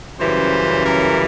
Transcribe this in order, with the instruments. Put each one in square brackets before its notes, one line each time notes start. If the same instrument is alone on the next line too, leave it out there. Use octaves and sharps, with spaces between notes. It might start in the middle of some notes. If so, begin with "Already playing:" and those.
[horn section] F#2 C#3 E3 G3 C5
A#4